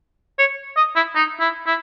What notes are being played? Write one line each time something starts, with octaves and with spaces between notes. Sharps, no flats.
C#5
D#5
E4
D#4
E4
E4